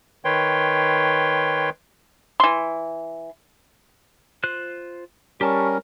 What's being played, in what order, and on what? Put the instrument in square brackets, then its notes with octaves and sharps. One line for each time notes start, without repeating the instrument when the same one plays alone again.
[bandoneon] D#3 B4 C#5 G5 C6
[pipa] E3 C6
[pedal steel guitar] F4 C5 F#6
[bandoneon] G3 C#4 A#4 [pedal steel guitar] G4 A5 C#6